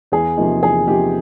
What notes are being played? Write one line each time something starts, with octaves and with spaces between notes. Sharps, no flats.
E2 G#4
C3 F3 A#3 D#4
E2 G#4
C3 F3 A#3 D#4 G4